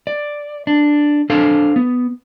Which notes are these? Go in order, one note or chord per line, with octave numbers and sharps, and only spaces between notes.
D5
D4
D4 A4 C5 F5
B3